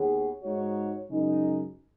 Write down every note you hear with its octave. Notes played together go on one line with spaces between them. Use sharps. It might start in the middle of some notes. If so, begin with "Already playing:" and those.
Already playing: D#2 D#3 B3 G#4 C#5
G#2 G#3 D#4 F#4 C#5
F#2 C#3 G#3 D#4